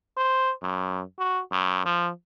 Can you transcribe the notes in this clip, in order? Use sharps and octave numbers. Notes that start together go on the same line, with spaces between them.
C5
F#2
F#4
F#2
F3